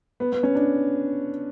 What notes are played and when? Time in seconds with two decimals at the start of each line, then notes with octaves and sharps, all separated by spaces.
0.20 B3
0.32 B3
0.43 C#4
0.55 D4